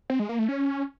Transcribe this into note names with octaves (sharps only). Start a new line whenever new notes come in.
C4
G#3
A#3
A3
C#4